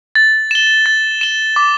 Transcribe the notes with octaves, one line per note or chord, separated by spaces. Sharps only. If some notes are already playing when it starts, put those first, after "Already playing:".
A6
E7 G7
A6
E7 G7
D6